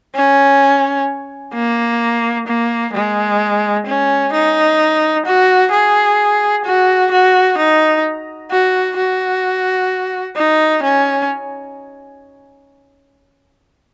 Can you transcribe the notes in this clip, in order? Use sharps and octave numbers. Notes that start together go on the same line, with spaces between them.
C#4
A#3
A#3
G#3
C#4
D#4
F#4
G#4
F#4
F#4
D#4
F#4
F#4
D#4
C#4